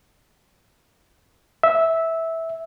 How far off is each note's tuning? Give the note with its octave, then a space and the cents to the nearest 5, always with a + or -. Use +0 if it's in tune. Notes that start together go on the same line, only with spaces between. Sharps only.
E5 -10